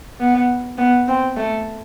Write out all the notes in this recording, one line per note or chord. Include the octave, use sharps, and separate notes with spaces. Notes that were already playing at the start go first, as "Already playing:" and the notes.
B3
B3
C4
A3